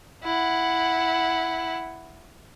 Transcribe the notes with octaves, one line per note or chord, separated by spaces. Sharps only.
E4 F#5